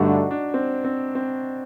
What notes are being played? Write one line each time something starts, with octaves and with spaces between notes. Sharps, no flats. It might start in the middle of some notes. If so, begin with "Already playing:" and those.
Already playing: G2 D3 A3 D#4 F#4
D4
D4
C4
C4
C4